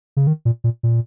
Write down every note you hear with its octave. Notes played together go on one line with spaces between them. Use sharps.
C#3
D#3
A#2
A#2
A#2